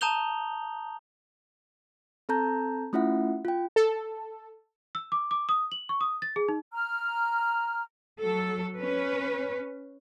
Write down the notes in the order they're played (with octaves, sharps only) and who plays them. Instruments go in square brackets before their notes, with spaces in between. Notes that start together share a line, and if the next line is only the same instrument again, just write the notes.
[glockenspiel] A5 A#5 D#6 G6 F7 G7
[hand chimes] C4 A4 A5 A#5 G6
A3 C#4 E4 F4 E5 F#5
F4 G5
[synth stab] A4
[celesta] E6
D6
D6
D#6
F#7
C#6
D#6
A6
G#4
D#4
[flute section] A#5 F6
[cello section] F#3 A4
C#4 B4